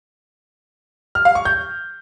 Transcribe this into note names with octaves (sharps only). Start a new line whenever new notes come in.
F6
F5
C#6
G6